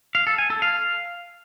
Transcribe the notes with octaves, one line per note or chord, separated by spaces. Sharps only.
F5
A4
G#5
A4
F5